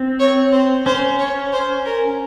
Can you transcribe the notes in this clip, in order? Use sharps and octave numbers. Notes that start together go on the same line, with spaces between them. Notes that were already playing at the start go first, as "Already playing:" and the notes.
Already playing: C4
C#5
C5
C#4 C5
C#5
C5
A#4